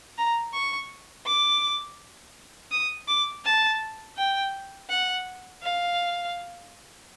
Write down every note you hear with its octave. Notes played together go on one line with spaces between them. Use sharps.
A#5
C#6
D6
D#6
D6
A5
G5
F#5
F5